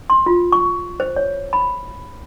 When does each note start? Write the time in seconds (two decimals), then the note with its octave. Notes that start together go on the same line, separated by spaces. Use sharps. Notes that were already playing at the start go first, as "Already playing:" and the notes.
0.10 C6
0.26 F4
0.52 C#6
1.00 C5
1.16 C#5
1.53 B5